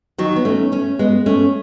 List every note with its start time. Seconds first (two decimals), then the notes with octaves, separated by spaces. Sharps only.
0.18 D#3 F#3
0.36 B3
0.45 A3 C#4
0.72 A3 C#4
0.99 G#3 B3
1.26 A3 C#4